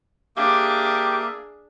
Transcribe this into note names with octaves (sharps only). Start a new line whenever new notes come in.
A#3 D4 G4 G#4 E5 F5 D6